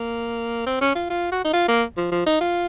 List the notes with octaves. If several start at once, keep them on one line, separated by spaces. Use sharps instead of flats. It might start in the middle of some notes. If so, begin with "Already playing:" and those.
Already playing: A#3
C4
C#4
F4
F4
F#4
D#4
F4
A#3
F3
F3
D#4
F4